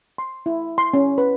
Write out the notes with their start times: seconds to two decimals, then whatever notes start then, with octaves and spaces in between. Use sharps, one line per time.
0.18 C6
0.46 E4
0.78 C6
0.94 C#4
1.18 B4